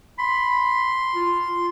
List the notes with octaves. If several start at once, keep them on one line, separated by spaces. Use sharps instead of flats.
B5 C6
F4